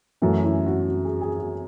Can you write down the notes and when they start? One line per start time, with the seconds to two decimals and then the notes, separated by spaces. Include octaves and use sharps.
0.22 F#2 E3 A3 C#4 F#4
0.44 E4
0.66 F#4
0.88 F#4
1.05 G#4
1.21 G#4
1.38 F#4